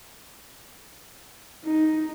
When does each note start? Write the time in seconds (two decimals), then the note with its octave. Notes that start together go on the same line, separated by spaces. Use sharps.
1.65 D#4